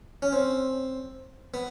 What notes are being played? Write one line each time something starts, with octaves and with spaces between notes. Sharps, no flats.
C#4
C4
B3